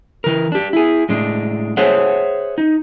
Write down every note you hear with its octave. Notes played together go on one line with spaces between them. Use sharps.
E3 A#4
D4 G4
E4 G#4
A2 G#3 D4
G#4 C5 C#5 E5 F#5
D#4